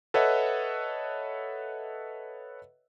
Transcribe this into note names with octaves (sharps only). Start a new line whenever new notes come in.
A4 B4 C#5 D#5 E5 F#5